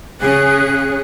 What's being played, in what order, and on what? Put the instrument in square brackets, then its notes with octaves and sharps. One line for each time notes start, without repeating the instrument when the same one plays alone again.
[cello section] C#3 C#4 G#4 [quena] F#6